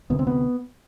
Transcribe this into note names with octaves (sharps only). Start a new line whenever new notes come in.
D2 C3 B3
C4
B3